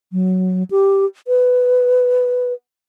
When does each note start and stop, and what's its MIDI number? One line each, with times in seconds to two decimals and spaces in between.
0.13 0.63 54
0.71 1.05 67
1.28 2.53 71